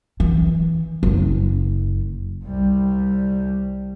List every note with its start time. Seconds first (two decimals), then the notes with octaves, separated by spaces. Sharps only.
0.20 E3
1.03 F#1
2.44 C2 G3